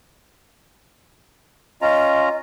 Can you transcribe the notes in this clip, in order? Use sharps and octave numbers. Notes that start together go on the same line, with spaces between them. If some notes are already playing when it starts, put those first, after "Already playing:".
C#4 F4 D#5 A#5